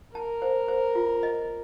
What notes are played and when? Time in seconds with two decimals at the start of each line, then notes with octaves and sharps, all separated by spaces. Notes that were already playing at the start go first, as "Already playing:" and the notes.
0.15 A#4 A5
0.42 C5
0.68 C5
0.95 F4
1.23 D#5